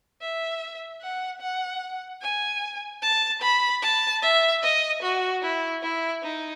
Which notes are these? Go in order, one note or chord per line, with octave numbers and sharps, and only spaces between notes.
E5
F#5
F#5
G#5
A5
B5
A5
E5
D#5
F#4
E4
E4
D#4